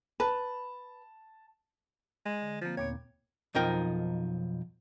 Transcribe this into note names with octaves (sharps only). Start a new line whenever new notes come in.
B4 A5
G#3
D3
F3 A#3 C4 F5
D#2 A#2 B3 C#5
B1 F2 F3 D#4 A#4 G5